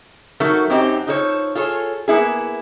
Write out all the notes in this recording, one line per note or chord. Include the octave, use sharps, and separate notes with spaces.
F#3 A3 D#4 F#4 A4 A#4
F#2 F#3 C4 D#4 G4
D#4 F4 A4 C5 C#5
F4 G#4 A4 C#5
A#3 B3 E4 G#4